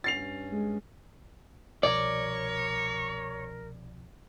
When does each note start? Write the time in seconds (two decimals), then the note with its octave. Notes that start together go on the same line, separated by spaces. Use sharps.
0.04 G2 C#4 A6 C7 F7
0.51 G#3
1.83 C2 B2 F3 A#4 C#5 D5